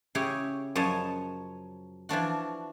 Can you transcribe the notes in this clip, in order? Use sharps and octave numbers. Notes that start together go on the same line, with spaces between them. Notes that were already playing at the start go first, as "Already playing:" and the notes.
C#3 E4 G4 G#4 C#5
F#2 F3 C#5 D#5 A5
E3 F3 D4 F#4